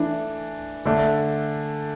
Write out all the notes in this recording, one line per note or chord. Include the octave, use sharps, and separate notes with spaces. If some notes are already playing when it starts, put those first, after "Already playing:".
Already playing: E3 A3 D4
D3 A3 D4